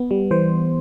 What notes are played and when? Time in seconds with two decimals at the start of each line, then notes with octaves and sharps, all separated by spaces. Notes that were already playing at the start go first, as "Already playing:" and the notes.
Already playing: B3
0.11 G3
0.31 E3 C5